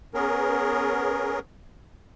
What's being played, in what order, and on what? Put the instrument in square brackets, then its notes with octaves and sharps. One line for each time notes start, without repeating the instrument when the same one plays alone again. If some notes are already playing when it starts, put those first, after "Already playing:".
[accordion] B3 C#4 G#4 A#4